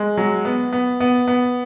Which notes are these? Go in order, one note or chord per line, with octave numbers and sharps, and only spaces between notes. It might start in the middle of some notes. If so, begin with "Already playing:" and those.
Already playing: G#3
F#3
B3
B3
B3
B3